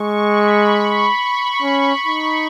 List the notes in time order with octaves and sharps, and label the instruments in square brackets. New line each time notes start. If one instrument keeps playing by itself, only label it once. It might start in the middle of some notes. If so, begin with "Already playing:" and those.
Already playing: [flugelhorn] G#3 [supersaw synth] C#6
[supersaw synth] B5
B5
C#6
[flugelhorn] C#4
D#4